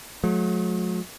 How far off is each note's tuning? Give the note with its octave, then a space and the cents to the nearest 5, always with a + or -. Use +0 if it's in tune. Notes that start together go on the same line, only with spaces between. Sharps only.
F#3 -40 A3 -45